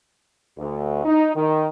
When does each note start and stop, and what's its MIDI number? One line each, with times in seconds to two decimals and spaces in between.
0.58 1.02 38
1.04 1.32 63
1.35 1.66 51